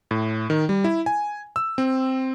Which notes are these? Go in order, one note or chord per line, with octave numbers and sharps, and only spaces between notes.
A2
D#3
G3
E4
G#5
E6
C4